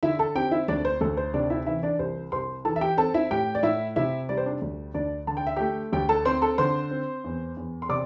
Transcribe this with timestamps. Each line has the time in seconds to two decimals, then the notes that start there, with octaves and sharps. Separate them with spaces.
0.03 D3 E4 E5
0.19 A4 A5
0.35 C4 G4 G5
0.51 E4 E5
0.68 D2 D4 D5
0.85 C5
1.01 D2 A4
1.17 C5
1.34 C3 D4 D5
1.50 E4 E5
1.66 E3 E4 E5
1.83 D4 D5
1.99 C2 C5
2.32 C2 C5 C6
2.65 E3 A4 A5
2.76 E5
2.81 G4 G5
2.97 C4 A4 A5
3.14 E4 E5
3.31 A2 G4 G5
3.55 D5
3.63 A2 E4 E5
3.96 C3 E4 E5
4.29 G3 D5
4.37 C5
4.46 D4 D5
4.62 D2
4.94 D2 D4 D5
5.27 D3 A5
5.37 G5
5.47 E5
5.56 A3 G4 G5
5.92 D2 G4 G5
6.09 A4 A5
6.25 C4 C5 C6
6.42 A4 A5
6.58 D3 C5 C6
6.91 C4
7.24 E2
7.57 E2
7.82 C6
7.89 C3 D5 D6